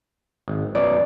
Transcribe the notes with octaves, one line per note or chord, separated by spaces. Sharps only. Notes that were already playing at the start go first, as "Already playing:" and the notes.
G#1
F#2 B2 D5